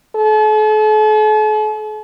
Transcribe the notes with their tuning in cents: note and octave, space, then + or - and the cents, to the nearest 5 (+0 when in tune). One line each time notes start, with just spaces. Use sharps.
A4 -45